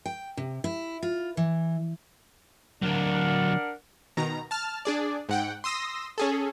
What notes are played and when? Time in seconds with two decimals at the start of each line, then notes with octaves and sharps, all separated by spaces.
0.06 G5
0.37 C3
0.64 E4
1.03 F4
1.37 E3
2.83 D3 F#3 D4 A#4 F#5
4.17 B2 D#3 A#5
4.51 A5 F6
4.85 D4 G#4 D5
5.29 G#2 F#5 G5
5.64 C6 D#6 E6 A#6
6.18 C#4 G#4 A4